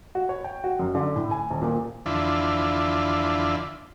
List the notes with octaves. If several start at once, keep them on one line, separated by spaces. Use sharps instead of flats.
F#4
C#5
G5
F#4
F#2
D3
A2
G#5
D#1
A#2
F2 D3 E3 D4 E4 F4